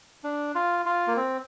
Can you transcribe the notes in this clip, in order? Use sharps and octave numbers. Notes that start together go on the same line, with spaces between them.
D4
F4
F4
A#3
C4